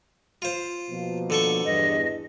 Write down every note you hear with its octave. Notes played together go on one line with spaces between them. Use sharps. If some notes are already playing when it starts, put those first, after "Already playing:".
F4 C5
B2 F3 A#3
D3 A4 C#6
E2 G2 D#5